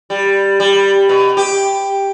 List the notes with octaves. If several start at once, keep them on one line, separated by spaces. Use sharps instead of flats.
G3
G3
B2
G4